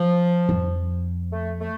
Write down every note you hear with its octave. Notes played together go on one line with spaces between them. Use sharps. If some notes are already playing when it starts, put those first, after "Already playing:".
Already playing: F3
F2
A3
A3